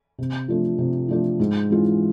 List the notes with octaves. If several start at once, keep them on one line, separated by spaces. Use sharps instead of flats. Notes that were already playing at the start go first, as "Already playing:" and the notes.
C3
F3 A3 D4 F4
C3
F3 A3 D4 F4
G#2
E3 G#3 C#4 F4